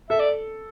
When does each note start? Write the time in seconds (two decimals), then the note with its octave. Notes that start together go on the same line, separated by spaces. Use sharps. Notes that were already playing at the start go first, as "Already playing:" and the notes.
0.10 A4 E5
0.20 D5